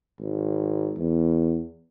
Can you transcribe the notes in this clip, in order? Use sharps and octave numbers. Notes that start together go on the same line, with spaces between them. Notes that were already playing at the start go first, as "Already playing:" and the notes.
G#1
E2